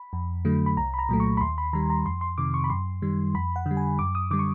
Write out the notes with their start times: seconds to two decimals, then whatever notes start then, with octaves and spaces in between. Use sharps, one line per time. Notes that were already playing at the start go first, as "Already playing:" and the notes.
Already playing: B5
0.13 F2
0.45 D3 F#3 A3
0.66 B5
0.77 C2 A#5
0.94 B5
0.99 A#5
1.09 A#2 F#3 A3
1.20 C#6
1.37 B5
1.41 D#2 C6
1.58 B5
1.73 D#3 G3 A#5
1.90 A#5
2.05 F2 C6
2.21 C6
2.38 C3 D#3 D6
2.54 C#6
2.64 B5
2.70 F#2 C6
3.02 D#3 G3
3.34 F2 B5
3.56 F#5
3.66 D3
3.71 G3
3.77 G#5
3.99 F#2 D6
4.15 D#6
4.31 D3 G3 D6
4.39 C#6